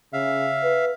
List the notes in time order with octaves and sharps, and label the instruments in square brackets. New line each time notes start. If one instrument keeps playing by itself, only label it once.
[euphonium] C#3 [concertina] E5 F5
[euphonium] B4